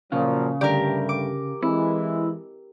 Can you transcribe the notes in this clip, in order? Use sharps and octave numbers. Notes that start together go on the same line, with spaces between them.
A#2 C#3 F3 F#3 F5
G2 D3 G3 A3 G4 A#4 D5
D6
E3 G#3 C4 E4